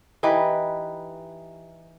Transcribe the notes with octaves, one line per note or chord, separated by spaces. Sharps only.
E3 D#4 G4 B4